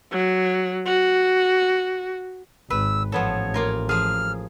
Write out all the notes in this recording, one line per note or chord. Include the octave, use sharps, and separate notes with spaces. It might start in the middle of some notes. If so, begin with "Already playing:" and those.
F#3
F#4
G#1 B4 E6
A1 F3 B3 A4 C#5
A#3 F4 A#4
F3 G#4 F6